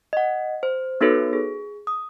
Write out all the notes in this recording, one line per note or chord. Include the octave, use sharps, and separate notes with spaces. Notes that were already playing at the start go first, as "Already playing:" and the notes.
D#5 F#5
C5
B3 D#4 F#4 A4 B4 C#5
G#4
D#6